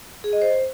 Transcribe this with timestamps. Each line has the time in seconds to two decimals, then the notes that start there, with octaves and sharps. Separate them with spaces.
0.24 G#4
0.33 D#5
0.42 C5